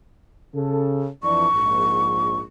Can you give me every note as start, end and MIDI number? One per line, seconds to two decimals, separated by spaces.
0.55 1.08 49
0.55 1.08 69
1.23 1.47 41
1.23 1.47 52
1.23 1.47 62
1.23 2.36 85
1.53 2.43 34
1.53 2.43 44